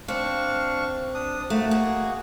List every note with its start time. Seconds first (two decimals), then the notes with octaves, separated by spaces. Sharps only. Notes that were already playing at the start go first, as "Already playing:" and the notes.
0.08 C4 D4 F5 C#6
1.15 D4 D#6
1.50 A3 A#3 F#4 F#5
1.71 G#4